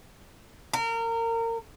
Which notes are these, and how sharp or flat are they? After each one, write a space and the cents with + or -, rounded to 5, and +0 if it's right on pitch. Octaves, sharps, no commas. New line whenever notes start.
A#4 -25